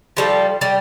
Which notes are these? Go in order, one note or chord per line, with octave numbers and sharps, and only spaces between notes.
F3 G3 A4
G3